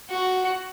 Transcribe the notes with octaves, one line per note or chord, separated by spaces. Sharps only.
F#4